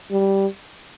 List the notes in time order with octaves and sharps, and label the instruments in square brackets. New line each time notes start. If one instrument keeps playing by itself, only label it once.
[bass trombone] G3